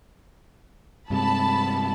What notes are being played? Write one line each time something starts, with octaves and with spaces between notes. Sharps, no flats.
G2 C3 G#3 A5 B5